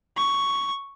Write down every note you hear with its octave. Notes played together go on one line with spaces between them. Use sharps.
C#6